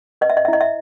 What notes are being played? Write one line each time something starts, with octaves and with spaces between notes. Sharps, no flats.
B4 D#5
E5
D#5
E5
E4 D#5
E5